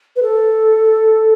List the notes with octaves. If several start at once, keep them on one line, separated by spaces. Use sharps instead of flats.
B4
A4